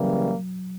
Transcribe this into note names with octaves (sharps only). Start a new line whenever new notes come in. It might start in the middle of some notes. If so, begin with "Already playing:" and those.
Already playing: C#3 E3 F#3 G3 A#3